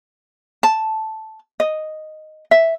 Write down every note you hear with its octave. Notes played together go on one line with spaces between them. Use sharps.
A5
D#5
E5